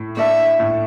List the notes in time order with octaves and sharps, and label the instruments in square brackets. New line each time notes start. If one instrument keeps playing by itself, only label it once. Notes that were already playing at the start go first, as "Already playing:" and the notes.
Already playing: [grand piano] A2
[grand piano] A3 D4 A4 [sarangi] E5
[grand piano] A2